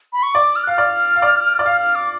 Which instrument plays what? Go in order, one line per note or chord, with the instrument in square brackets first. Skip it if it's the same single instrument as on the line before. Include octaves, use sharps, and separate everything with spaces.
[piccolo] B5
C#6
[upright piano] D5 [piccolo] D6
[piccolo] F6
F#6
[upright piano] F5 [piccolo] F6
[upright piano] D5
F5
D5
D5
[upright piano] F5 [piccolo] F6
[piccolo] F6
D6